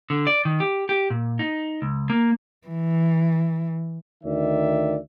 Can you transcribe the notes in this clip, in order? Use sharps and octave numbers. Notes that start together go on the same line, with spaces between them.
D3
D5
D#3
G4
G4
A#2
D#4
C#2
A#3
E3
D2 D#3 D5 E5